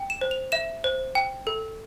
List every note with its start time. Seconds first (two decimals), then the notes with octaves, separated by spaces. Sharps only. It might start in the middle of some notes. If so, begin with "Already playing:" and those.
Already playing: G5
0.10 E7
0.21 C5
0.31 F7
0.52 E5 E7
0.84 C5
1.15 G5
1.47 A4